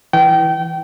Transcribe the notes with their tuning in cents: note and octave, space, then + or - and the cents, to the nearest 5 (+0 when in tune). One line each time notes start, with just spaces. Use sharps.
E3 +0 G5 -25